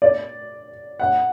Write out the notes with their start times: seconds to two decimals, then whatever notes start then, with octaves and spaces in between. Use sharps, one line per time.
0.02 D5
0.99 F#5